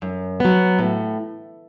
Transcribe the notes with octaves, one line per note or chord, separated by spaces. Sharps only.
F#2
F#3 B3
A2